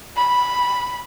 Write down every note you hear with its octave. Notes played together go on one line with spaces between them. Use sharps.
B5